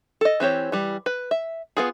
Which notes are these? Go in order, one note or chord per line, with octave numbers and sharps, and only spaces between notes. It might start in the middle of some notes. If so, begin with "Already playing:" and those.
A4 D#5
E3 C4 G4 C#5
E3 G3
B4
E5
B3 F4 G#4